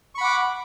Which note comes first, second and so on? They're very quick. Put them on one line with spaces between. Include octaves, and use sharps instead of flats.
C#6 B5 F#5 D6